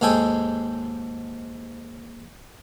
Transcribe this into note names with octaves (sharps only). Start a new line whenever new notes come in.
D#2 G#2 G#3 A4 G5 G#5